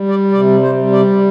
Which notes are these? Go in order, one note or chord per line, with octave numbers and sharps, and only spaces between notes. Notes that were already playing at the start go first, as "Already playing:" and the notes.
Already playing: G3
D5
C3 D5
C5
G3
D5